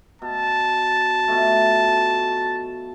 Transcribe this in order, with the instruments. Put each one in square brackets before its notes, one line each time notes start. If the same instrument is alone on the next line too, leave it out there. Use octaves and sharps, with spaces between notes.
[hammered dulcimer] B2 [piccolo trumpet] A5
[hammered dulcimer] B2 F3 A3